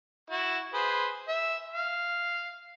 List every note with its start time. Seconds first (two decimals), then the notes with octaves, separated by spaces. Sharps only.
0.30 E4 F#4
0.74 G#4 B4 C5
1.28 E5
1.73 F5